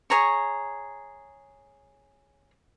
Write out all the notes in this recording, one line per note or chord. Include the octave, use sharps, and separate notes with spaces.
G#4 C#5 A#5 C#6